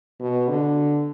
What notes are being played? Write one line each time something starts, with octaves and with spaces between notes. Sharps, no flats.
B2
D3